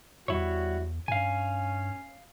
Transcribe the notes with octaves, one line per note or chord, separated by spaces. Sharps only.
E2 G3 E4 F#4 C#5
G2 C#4 F5 G#5